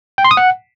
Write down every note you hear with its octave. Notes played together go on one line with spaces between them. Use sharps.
G5
C6
D#6
F#5